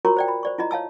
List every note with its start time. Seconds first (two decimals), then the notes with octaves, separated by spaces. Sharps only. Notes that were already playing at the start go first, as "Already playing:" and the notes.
0.05 F4 F#4 A#4 C#5 A#5 C#6
0.17 C5 D5 G5
0.28 B5
0.43 C5 D5 C#6
0.58 E4 F4 D#5 A#5
0.71 C#5 F5 A5 E6